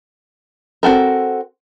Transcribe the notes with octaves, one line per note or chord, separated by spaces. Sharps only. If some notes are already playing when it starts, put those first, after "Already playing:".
C4 F#4 A4 A#4